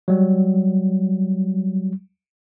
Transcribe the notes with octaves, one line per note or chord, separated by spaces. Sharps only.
F#3 G3